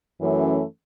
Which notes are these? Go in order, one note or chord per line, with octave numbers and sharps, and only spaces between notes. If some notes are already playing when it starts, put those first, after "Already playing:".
F#2 E3 A3 C#4